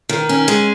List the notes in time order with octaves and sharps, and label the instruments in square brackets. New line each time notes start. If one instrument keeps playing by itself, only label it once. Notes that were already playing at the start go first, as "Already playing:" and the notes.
[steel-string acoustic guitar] D#3
C#4
G#3